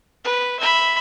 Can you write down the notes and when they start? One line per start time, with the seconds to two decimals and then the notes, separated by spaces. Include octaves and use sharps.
0.24 B4
0.60 E5 B5